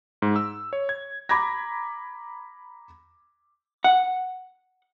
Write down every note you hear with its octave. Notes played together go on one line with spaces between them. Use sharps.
G#2
E6
C#5
G#6
A#5 B5 D6 G#6 A#6
F#5